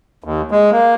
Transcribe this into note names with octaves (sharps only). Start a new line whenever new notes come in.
D#2
G#3
A#3